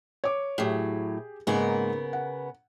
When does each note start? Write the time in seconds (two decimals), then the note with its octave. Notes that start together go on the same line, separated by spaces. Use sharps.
0.24 C#5 D6
0.58 A2 F#3 G4 G#4
1.47 G#2 C#3 A#3 B3 D#4 A#4
2.13 F#5